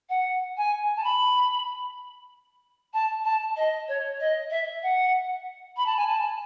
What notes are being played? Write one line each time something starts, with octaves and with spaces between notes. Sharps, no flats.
F#5
G#5
A5
B5
A5
A5
D#5
C#5
D#5
E5
F#5
B5
A5
G#5
A5